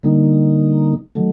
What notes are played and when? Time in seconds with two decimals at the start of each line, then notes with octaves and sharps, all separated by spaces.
0.03 D3 G3 A#3 D#4
1.15 D#3 F#3 A3